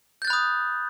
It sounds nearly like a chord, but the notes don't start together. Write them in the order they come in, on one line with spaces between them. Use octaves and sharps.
G6 A6 F#6 B5 D#6